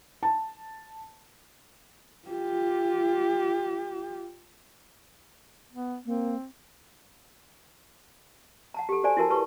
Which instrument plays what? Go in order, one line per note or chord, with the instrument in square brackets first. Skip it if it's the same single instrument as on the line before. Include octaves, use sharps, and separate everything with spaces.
[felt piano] A5
[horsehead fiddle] F4 G4
[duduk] B3
[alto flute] A#3 [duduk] C4
[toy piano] F#5 A5 A#5
G4 A4
F#4 A4 C5 D5 G#5 A#5
E4 F#4 A#4 A5
F#4 G4 B4 A5 A#5 C#6